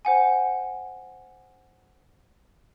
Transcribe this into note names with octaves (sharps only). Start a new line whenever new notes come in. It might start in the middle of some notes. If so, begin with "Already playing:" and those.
C5 F#5 G#5